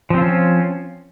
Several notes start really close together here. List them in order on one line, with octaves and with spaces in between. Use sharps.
F3 C4 F4 C#4